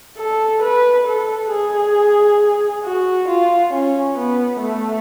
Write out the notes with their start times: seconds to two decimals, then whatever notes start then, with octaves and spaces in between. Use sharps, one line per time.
0.17 A4
0.62 B4
1.07 A4
1.51 G#4
2.84 F#4
3.28 F4
3.73 C#4
4.18 B3
4.62 A3